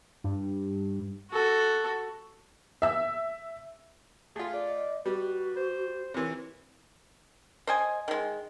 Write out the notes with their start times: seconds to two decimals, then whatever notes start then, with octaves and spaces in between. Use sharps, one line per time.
0.24 G2
1.31 F#4 A4
2.82 E5 E6
4.36 A3 F4 G#4
4.54 D5
4.68 D#5
5.06 G3 F#4 B4
5.56 C5
6.14 C3 E3 A#4 C#5
7.67 C5 D#5 G#5
8.08 D#3 G#3